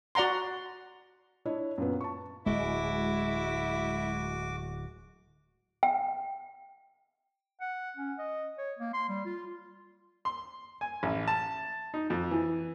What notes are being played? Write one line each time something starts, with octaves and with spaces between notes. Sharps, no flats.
F#4 D5 F#5 A#5 C6
D4 E4 C#5 D#5
F#2 A#2 B3
A5 C#6
D1 G#3 E4 F#4 D6
G5
F#5
C#4
D#5
C#5
A#3
C6
G3
F4
C6
G#5
A1
A5
D#4
F2
E3